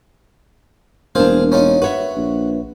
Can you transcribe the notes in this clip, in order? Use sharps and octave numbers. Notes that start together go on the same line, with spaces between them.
E1 A#3 D4 G#4 C5 F5
C#4 D#4 F4
F#4 B4 C#5 E5
A#1